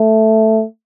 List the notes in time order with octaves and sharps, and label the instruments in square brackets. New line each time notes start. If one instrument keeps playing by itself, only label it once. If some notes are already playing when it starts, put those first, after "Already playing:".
Already playing: [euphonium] A3